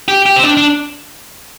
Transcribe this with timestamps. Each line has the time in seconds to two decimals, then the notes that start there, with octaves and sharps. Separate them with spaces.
0.08 G4
0.26 G4
0.36 C4
0.43 D4
0.57 D4